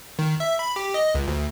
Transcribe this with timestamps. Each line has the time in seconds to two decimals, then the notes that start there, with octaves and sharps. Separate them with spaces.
0.19 D#3
0.40 E5
0.59 B5
0.76 G4
0.94 D#5
1.15 C#2
1.28 D2